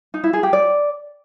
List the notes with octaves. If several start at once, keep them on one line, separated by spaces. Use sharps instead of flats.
D#4
E4
G#4
G4
D5